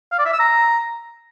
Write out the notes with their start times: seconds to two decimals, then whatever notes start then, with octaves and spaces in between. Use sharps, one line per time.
0.12 F5
0.19 D5
0.26 E5
0.33 E6
0.40 A#5